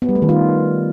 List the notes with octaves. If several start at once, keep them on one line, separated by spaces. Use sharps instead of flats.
B3
G3
A3
D#3
F4